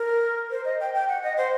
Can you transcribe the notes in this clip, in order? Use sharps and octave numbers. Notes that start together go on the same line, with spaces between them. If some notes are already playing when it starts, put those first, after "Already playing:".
Already playing: A#4
C5
D#5
G5
G5
F#5
D#5
C5